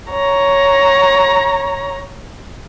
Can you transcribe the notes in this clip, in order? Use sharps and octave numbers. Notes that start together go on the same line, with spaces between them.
C#5 A#5